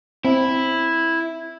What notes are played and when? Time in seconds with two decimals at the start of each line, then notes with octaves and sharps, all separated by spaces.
0.25 C4 E4